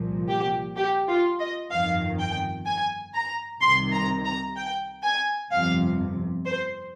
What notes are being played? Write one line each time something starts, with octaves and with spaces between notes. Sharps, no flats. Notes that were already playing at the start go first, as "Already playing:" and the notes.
Already playing: C2 A#2 F3
G4
G4
F4
D#5
G1 F2 D#3 F5
G5
G#5
A#5
C2 C3 D#3 C6
A#5
A#5
G5
G#5
G1 F2 C3 F3 F5
C5